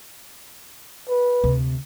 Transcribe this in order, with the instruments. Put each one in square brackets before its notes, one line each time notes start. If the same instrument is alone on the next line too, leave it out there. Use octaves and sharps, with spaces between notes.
[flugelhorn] B4
[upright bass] D2 C3